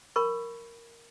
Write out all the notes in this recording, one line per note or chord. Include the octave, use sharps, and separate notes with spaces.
A#4 B5 C#6